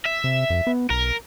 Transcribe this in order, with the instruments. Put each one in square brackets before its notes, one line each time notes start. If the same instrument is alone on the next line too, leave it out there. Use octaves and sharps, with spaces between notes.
[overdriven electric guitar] E5
[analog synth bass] C3
F2
B3
[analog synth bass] B1 [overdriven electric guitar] A#4